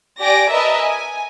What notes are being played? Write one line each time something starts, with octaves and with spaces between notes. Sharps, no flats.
G4 D5 G#5 A#6 D7
A#4 B4 D#5 E5 A5
G#5